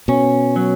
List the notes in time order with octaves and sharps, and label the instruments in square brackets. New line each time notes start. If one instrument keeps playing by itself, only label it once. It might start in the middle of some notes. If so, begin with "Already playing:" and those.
[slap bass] B2 [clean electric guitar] C#4
[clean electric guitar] F#3